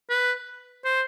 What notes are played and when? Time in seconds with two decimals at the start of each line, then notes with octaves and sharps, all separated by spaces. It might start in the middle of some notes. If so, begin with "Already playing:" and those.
0.10 B4
0.85 C5